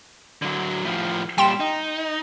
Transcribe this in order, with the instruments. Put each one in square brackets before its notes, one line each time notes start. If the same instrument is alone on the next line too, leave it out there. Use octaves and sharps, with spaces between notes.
[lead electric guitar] D3 F#3
A2 F3
[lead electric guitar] A#2 G3 [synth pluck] G5 C6 E7
[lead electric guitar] D#4